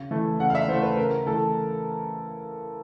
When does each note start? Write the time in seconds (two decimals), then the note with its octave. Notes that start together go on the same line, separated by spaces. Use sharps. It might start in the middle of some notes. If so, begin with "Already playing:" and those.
Already playing: C#3
0.11 E3 A3
0.39 C#3 F#5
0.50 F5
0.55 E5
0.68 E3 C5
0.72 A3
0.83 B4
0.97 C#3 A#4
1.26 E3 A3 A4